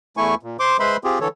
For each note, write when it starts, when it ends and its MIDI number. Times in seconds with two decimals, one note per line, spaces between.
0.17 0.35 40
0.17 0.35 57
0.17 0.35 64
0.17 0.35 80
0.17 0.35 85
0.43 0.57 46
0.59 0.77 72
0.59 0.77 84
0.59 0.77 86
0.80 0.97 56
0.80 0.97 71
0.80 0.97 72
0.80 0.97 76
0.80 0.97 83
0.80 0.97 84
1.04 1.19 60
1.04 1.19 65
1.04 1.19 67
1.04 1.19 68
1.20 1.28 50
1.20 1.28 52
1.20 1.28 69
1.20 1.28 73